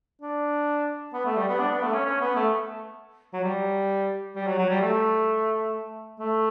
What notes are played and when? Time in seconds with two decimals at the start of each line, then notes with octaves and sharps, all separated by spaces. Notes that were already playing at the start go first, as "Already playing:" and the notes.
0.22 D4
1.13 B3
1.25 A3
1.37 G3
1.48 B3
1.59 D4
1.72 B3
1.83 A3
1.94 C#4
2.06 C#4
2.21 B3
2.36 A3
3.33 F#3
3.44 G3
4.36 G3
4.47 F#3
4.58 F#3
4.70 G3
4.81 A3
6.19 A3